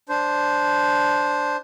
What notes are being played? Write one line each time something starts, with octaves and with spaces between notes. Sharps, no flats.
D4 C5